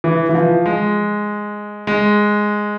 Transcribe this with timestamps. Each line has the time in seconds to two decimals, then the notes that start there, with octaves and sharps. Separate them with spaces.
0.04 E3
0.29 E3
0.35 F3
0.66 G#3
1.87 G#3